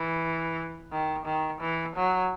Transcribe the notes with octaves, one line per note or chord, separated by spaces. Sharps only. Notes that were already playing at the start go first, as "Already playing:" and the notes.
Already playing: E3
D#3
D#3
E3
F#3